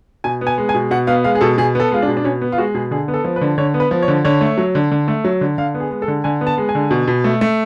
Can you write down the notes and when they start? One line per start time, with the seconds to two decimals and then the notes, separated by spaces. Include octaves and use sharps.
0.24 B2 G#5
0.41 B3
0.47 G#5
0.58 G#3
0.69 G#5
0.75 B2
0.91 B2 F#5
1.07 B3 F5
1.24 G#3 F5
1.35 G#4
1.41 B2 A4
1.58 B2 G#4
1.75 B3 A4
1.91 G#3 F4
2.02 D4
2.08 B2
2.17 D4
2.24 B2 C#4
2.41 B3
2.52 F4
2.58 G#3 F#4
2.75 B2 G#4
2.91 D3 G#4
3.08 B3
3.14 A4
3.24 F3
3.36 B4
3.41 D3
3.58 D3 C#5
3.74 B3
3.80 B4
3.91 F3
4.02 C#5
4.08 D3
4.25 D3 C#5
4.41 A3
4.58 F#3
4.75 D3
4.91 D3
5.08 A3
5.25 F#3
5.41 D3
5.58 D3 F5
5.75 B3
5.80 G#4
5.91 G#3
6.02 A4
6.08 D3
6.24 D3 G#5
6.41 B3
6.47 A5
6.58 G#3
6.69 G#5
6.75 D3
6.91 B2
7.08 B2
7.24 A3
7.41 A3